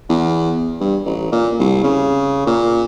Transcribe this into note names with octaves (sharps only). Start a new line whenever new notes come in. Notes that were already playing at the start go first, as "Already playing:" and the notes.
E2
G2
A1
A#2
C2
C#3
A#2